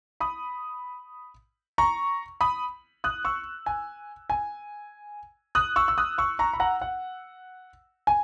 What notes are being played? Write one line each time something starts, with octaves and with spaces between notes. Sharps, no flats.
B5 D#6
A#5 C#6
B5 D#6
D#6 F#6
C#6 E6
G#5
G#5
D#6 F#6
C#6 E6
E6
D#6 F#6
C#6 E6
A#5 C#6
B5
F#5 A#5
F#5
G#5